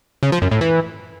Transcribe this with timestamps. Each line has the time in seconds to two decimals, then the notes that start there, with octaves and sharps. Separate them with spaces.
0.23 C#3
0.32 F3
0.42 F#2
0.51 A2
0.61 E3